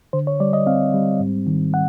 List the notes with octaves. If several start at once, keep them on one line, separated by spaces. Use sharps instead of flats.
D3 C5
C#5
G3 D5
D#5
C4 F5
G3
G#2
D#3
F#5